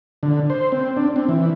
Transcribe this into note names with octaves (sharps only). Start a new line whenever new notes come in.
D3
C5
C4
D4
C4
E3